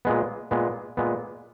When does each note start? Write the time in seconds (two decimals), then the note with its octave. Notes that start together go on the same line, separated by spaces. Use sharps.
0.05 A#2 G#3 B3
0.51 A#2 G#3 B3
0.97 A#2 G#3 B3